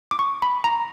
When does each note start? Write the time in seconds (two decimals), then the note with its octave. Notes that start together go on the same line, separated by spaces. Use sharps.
0.11 D6
0.19 C#6
0.42 B5
0.64 A#5